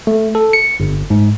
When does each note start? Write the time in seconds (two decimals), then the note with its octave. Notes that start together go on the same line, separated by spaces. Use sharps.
0.07 A3
0.35 A4
0.53 C#7
0.80 G1
1.10 G#2